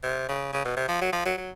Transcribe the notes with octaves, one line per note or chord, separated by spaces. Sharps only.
C3
C#3
C#3
B2
C3
F3
F#3
F3
F#3
F#3